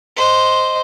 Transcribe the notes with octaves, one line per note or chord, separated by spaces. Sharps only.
C5 D#5